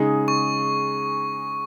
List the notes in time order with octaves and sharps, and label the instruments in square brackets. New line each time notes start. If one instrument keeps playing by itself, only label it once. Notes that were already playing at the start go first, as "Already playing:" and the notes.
Already playing: [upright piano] C#3 G#3 D#4 G#4
[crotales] C#6